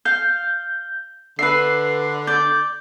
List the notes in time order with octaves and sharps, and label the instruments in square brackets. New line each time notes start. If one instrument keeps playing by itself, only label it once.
[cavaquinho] F5 [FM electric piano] G6
[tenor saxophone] D3 [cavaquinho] B4 E5 [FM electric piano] C7
[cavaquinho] D5 [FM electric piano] G6